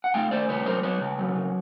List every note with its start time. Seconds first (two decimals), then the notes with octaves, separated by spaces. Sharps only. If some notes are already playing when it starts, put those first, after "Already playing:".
0.04 F#5
0.14 A3 F5 G5
0.31 A3 C5 D5
0.48 C#3 B4 C#5
0.66 F#3 A#4 C5
0.83 F#3 B4 C#5
1.01 C#3
1.19 F#3
1.35 C#3